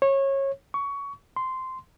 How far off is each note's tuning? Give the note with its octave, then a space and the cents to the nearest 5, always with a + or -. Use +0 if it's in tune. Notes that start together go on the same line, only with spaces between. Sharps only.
C#5 -25
C#6 +20
C6 -10